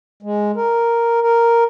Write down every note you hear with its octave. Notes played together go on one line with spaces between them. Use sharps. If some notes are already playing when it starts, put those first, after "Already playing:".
G#3
A#4
A#4